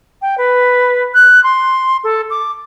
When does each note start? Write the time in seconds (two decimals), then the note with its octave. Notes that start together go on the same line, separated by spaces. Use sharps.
0.22 G5
0.38 B4
1.14 F#6
1.44 C6
2.04 A4
2.30 D6